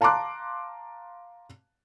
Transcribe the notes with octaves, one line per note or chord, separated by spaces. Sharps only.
F5 A5 A#5 C6 D6 F#6